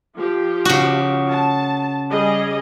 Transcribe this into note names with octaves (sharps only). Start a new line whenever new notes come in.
F3 G4
C#3 F#4
A5
G3 G#4 D#5